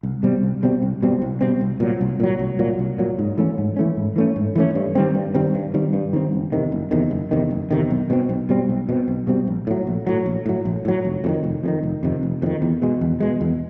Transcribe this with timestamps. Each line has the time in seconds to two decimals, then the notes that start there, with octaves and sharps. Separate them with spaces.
0.03 C2
0.23 B2 G3 C4
0.43 C2
0.63 B2 G3 C4
0.82 C2
1.02 B2 G3 C4
1.22 C2
1.41 B2 G3 C4
1.61 C2
1.80 A#2 F#3
2.01 C2
2.20 A#2 F#3
2.39 C2
2.59 A#2 F#3
2.79 C2
2.98 A#2 F#3
3.19 G#2
3.38 E3 A3 C#4
3.58 G#2
3.77 E3 A3 C#4
3.97 G#2
4.16 E3 A3 C#4
4.36 G#2
4.55 E3 A3 C#4
4.75 G2
4.95 D#3 G3 C4
5.15 G2
5.35 D#3 G3 C4
5.55 G2
5.74 D#3 G3 C4
5.93 G2
6.13 D#3 G3 C4
6.33 F#1
6.52 E2 C3 D#3
6.72 F#1
6.91 E2 C3 D#3
7.11 F#1
7.31 E2 C3 D#3
7.51 F#1
7.71 E2 C3 D#3
7.91 B1
8.10 B2 G3 C4
8.29 B1
8.49 B2 G3 C4
8.69 B1
8.89 B2 G3
8.92 C4
9.08 B1
9.27 B2 G3 C4
9.47 A#1
9.67 A2 F#3
9.87 A#1
10.07 A2 F#3
10.26 A#1
10.46 A2 F#3
10.65 A#1
10.85 A2 F#3
11.05 F1
11.24 F2 C3 D#3
11.44 F1
11.63 F2 C3 D#3
11.83 F1
12.03 F2 C3 D#3
12.23 F1
12.42 F2 C3
12.46 D#3
12.62 E2
12.82 B2 G#3
13.01 E2
13.20 B2 G#3
13.41 E2